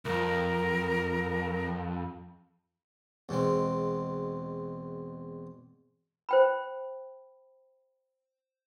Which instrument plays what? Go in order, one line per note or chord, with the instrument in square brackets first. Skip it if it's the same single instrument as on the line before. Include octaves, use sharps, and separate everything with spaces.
[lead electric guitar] C2 F2 [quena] A#4
[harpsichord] E2 B2 G#3 C4
[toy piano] C5 G5 B5